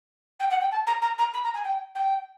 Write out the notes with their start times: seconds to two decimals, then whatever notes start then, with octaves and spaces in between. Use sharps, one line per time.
0.39 G5
0.50 F#5
0.60 G5
0.71 A5
0.86 A#5
1.01 A#5
1.18 A#5
1.33 B5
1.43 A#5
1.54 G#5
1.64 G5
1.95 G5